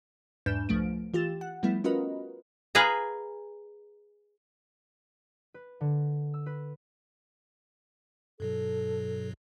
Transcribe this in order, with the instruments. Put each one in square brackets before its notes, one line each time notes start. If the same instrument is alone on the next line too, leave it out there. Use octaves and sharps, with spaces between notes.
[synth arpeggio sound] E2 G#2 D4 B4 G6 E7
C2 F3 A3 D7
E3 F4 G4 A6 E7
F#5
F3 G3 A3 B3 E4
C#4 F4 F#4 A#4 B4 D#5
[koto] G#4 B4 F5 G#5 A#5
[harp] B4
D3
E6
B4
[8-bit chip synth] G2 B2 F#3 [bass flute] A4